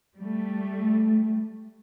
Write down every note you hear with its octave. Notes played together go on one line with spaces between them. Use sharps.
G3 A3